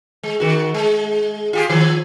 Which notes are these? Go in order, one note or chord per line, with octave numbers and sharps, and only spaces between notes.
G#3
D#3 F#4
G#3
F4 G4 G#4
D#3 F3